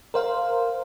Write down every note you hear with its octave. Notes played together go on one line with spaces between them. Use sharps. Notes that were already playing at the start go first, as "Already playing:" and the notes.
A#4 C5 F5